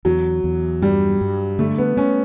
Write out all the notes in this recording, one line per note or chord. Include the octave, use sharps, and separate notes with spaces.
E2 F#3
E2
G2 G3
G2
D3 A3
B3
A3 C#4